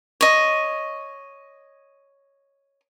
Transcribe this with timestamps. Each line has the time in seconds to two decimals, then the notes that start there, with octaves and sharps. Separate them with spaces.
0.21 C#5 D#5